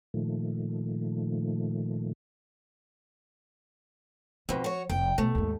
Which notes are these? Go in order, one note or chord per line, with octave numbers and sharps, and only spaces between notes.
A#2 D#3 F3 A3
F2 B2 F3
F#4 C#5
F1 G5
B2 A3
D#2 G#2